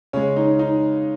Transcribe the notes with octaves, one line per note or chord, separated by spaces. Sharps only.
C#3 G#3 C#4
D#4
D#4